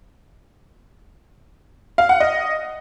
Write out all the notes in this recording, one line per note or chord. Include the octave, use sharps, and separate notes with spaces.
F5
F#5
D#5